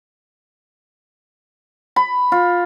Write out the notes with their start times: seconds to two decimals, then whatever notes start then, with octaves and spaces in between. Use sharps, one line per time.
1.96 B5
2.32 F4